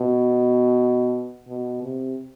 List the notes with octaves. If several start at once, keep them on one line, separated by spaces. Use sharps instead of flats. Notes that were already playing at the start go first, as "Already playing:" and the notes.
Already playing: B2
B2
C3